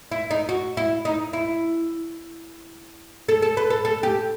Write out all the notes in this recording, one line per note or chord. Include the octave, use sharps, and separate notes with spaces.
E4
D#4
F#4
E4
D#4
E4
A4
A4
B4
A4
A4
G4